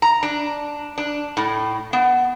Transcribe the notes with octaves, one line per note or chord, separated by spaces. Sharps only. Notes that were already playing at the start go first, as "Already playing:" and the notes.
A#5
D4
D4
A2
B3